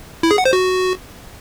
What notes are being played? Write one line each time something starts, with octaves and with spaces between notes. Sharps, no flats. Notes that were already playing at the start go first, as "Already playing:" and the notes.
E4
G#4
F#5
C5
F#4